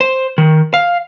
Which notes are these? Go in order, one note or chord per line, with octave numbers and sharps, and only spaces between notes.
C5
D#3
F5